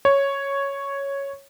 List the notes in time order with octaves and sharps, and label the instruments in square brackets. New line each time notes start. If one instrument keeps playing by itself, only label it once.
[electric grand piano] C#5